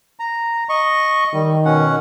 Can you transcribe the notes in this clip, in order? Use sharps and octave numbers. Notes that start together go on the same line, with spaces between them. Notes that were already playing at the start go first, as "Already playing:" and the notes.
A#5
D#5 C#6
D#3 G3
B2 C#4 F#5